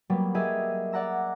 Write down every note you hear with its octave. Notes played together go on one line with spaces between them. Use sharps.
F#3 G3 A#3 B3
G4 G#4 A#4 D#5 E5
D5 F#5 A#5 E6